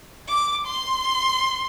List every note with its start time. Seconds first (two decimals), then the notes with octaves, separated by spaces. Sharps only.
0.29 D6
0.67 C6